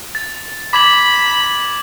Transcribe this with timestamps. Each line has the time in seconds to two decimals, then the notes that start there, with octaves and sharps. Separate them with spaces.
0.15 A6
0.73 B5 D6 G#6 F#7